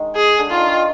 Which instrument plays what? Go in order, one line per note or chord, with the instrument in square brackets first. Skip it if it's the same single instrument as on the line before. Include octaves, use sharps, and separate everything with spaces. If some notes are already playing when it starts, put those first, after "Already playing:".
Already playing: [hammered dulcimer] D#3 G#3
[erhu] G#4
[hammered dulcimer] D3
[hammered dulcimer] D#3 [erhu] F4
[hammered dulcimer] D#3